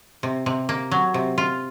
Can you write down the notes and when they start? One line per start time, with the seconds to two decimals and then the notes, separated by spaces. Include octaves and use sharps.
0.23 C3
0.46 C3
0.69 A#3
0.91 F#3
1.14 C3
1.38 F4